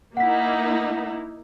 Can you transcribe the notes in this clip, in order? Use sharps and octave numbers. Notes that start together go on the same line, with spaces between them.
A#3 D#4 E4 F#5 B6